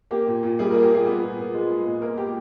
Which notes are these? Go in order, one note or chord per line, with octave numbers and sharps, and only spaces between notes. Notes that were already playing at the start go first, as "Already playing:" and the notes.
A#3 G4
A#2
A#2
G3 G#4
A#3 A#4
G4
A#2 G#4
B3
A#2
A#2
G#3
B3
A#2
A#3 A#4
G4